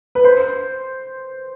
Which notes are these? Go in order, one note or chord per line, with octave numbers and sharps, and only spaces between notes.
B4
C5